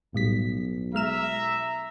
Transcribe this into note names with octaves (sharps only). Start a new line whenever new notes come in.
B1 A2 G3 B6
G#3 E5 A#5 F6 E7